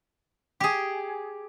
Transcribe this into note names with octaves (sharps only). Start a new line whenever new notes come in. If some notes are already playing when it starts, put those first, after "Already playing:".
G4 G#4